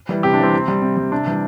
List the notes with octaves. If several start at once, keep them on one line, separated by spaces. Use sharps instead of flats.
E3 G3
C3 G4
D4
E3 G3 C4
C3
G3
C3
G3
C3 D4
E3 G3